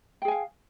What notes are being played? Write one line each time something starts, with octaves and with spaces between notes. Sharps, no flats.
G#4 F5 G5 G#5